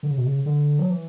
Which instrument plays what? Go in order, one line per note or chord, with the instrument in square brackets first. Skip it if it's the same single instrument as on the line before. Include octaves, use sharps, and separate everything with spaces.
[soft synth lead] D3
C#3
B2
C#3
D3
F#3
E3